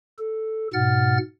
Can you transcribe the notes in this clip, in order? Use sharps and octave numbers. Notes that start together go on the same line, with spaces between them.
A4
G#2 B2 F#5 F6 A6